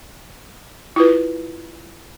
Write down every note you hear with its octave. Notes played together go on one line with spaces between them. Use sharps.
E4 F4 B4